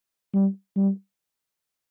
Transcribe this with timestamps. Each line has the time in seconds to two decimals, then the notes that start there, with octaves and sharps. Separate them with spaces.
0.34 G3
0.76 G3